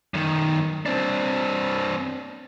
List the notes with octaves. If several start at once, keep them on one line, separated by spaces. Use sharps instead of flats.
F#2 D#3
C4 D4